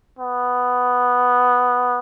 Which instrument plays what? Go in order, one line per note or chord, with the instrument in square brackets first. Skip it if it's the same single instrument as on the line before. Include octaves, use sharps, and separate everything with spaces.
[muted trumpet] B3